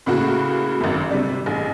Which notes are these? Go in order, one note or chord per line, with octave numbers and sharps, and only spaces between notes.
A2 C#3 A#3 F#4
G#1 F#2
C3 G3 D4
A1 G#4